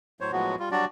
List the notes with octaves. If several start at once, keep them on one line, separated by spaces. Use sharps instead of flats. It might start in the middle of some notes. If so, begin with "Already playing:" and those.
A2 F#3 C5 C#5
A2 F3 F#3 G#3 B3 F#4
G3 F4
F#3 G3 D4 F#4 D5